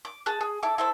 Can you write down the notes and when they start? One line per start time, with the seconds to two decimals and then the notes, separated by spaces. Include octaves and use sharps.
0.05 D6
0.26 G#4 A5 F#6
0.41 G#4
0.63 E4 A4 D6
0.78 E4 A4 C5